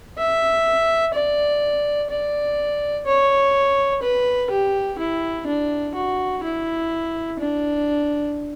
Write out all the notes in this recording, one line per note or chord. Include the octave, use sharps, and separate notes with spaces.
E5
D5
D5
C#5
B4
G4
E4
D4
F#4
E4
D4